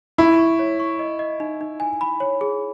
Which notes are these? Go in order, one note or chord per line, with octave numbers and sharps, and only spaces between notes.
E4 C#6
C#6
C#5
C#6
D#5
D#5
D#4
D#4
G#5
B5
C#5
G#4